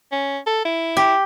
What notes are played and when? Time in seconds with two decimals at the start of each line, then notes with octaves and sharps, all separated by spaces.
0.12 C#4
0.46 A4
0.65 E4
0.97 G4